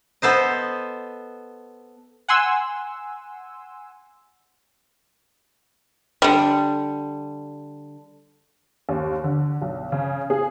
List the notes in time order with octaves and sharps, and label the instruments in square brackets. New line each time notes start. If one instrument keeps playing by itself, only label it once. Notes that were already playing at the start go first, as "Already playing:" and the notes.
[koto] B3 A4 C5 D#5
[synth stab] F#5 G#5 C6 E6
[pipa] D3 G3
[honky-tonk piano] D#2
D3
B1
C#3
G#4